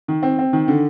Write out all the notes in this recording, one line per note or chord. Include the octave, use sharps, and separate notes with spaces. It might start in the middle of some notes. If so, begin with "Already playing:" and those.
D#3
C4
C4
D#3
D3